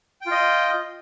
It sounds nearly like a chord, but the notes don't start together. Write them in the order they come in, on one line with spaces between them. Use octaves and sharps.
G5 F4 D#5